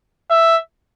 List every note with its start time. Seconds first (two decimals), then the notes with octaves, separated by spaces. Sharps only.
0.30 E5